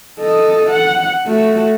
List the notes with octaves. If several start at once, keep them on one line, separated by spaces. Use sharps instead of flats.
A4 D#5
F#5
A3 F#4